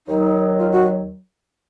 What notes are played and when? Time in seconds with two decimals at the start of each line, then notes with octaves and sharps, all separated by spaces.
0.07 D#2 D#3 F#3 D#4
0.58 F4
0.72 F#4